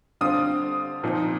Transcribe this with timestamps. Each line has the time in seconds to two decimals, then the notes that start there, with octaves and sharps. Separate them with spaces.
0.21 D3 G3 C4 F4 D#6
1.03 A#2 F3 C4 D#4